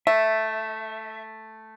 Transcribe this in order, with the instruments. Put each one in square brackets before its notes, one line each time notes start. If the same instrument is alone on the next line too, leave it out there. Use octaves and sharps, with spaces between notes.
[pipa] A3 [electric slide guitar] E5